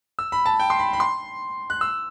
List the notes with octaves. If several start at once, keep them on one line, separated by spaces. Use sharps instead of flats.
E6
B5
A5
G5
C6
B5
B5
C6
F#6
E6